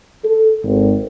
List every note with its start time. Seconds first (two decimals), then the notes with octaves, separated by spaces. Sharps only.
0.25 A4
0.64 G#1